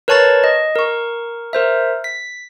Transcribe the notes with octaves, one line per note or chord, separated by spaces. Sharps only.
A#4 B4 C#5 A5 C#6 A6
D#5
A#4 C#6
A#4 C5 E5
B6